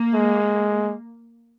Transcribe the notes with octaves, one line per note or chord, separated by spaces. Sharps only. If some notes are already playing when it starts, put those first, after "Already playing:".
Already playing: A#3
G#3